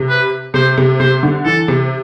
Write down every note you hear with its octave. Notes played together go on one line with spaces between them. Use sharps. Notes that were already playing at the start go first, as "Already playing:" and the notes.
Already playing: C3
B4
C3 C5
C3
C3 C5
D3
E3 A4
C3